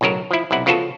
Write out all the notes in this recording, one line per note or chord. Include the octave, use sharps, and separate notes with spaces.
B1 A2 C#3 F#3 A#4
F3 E4
B1 C3 E4 F#5
C#3 F3 B3 F4 F#4 A4